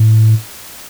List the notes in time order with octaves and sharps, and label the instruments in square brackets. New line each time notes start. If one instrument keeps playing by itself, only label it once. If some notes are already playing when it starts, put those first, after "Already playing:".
Already playing: [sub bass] A2